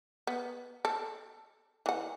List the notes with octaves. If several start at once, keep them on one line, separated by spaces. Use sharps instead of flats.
B3
A4
E3 F#5